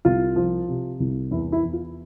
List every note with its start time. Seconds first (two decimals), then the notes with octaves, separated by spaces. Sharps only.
0.05 C2 F4
0.36 F3
0.68 C3
1.00 C2
1.31 E2 E4
1.52 E4
1.63 E2
1.73 F4